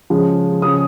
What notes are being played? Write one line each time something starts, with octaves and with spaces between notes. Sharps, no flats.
C#3 F3 G#3
C#3 F3 G#3 D#6